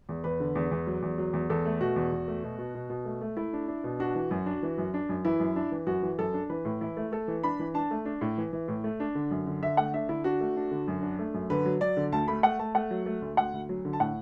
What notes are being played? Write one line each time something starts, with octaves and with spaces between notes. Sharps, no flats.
E2
E2 B4
D3
E2
E2
F#3
E2
F#3
E2
E2 A4
A3
B2 F#4
E2
E2
A3
B2
B2
B2
B2
A3
A3
A3 E4
D4
D4
B2
D4 F#4
E3
F#2
D4
E3
F#2
D4
F#2
E3 E4
F#2
D4
E3
F#2 F#4
E3
F#2 A4
D4
E3 B4
A2
E3 E4
A3
A3 A4
E3
D4 B5
E3
D4 A5
A3
D4
A2
E3
E3
A2
A3
D4
D3
F#2
D3
D3 E5
A3 F#5
D4 E5
D3 E4
D4 F#4
A3
D4
D3
F#2
D4
A3
F#2
D3 B4
F#3
F#3 D5
D3
D2 A5
A3 B5
A3 F#5
A3 A5
A3 F#5
F#3
A3
D2
D2 F#5
D2
F#3
D3
A5
A2 F#5